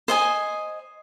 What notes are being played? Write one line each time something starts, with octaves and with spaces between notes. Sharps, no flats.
C5 D#5 G#5